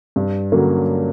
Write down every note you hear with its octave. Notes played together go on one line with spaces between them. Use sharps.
G2
D3 F#3 A#3 C#4